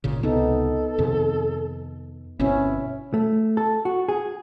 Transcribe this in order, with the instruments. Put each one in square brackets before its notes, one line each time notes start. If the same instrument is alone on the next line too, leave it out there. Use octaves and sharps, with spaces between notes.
[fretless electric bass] G#1 A#2 C#3
[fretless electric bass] C#2 C3 [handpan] B3 D#4 [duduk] A4
[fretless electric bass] F2 C3 D#3
[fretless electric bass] G1 B2 C4 [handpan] C#4 [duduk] E4
[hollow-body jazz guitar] A3
A4
F#4
G#4